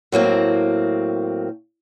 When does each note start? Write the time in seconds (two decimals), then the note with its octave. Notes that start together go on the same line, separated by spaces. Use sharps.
0.12 A2 F#3 A#3 C4